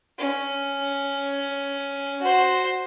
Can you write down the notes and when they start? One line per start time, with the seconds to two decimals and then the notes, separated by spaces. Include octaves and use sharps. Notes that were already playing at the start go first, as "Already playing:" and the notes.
0.19 C#4
2.22 F#4 C5